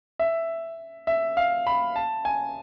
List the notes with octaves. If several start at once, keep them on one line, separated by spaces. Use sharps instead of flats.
E5
E5
F5
B5
A5
G#5